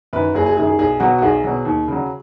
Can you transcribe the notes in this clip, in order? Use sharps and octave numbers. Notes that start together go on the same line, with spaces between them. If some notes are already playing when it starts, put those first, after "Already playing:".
F#2 D#3 B4
F#1 G#4
G#4
F#2 D#3 G#4
G#4
B1 G#4
B2 F#3 F#4
F#4
B1 G#4
B2 F#3
D#2
C#3 F#3